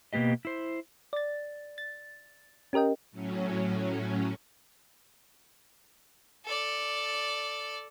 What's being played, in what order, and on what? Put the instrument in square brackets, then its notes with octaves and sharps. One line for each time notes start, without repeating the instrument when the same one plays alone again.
[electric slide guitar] B2 A#3 B3 G4 D#5
E4 C5
[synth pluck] D5 A6
A6
C#4 G4 A#4 D#5 G5
[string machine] A2 F#3 C#4
[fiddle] A4 D5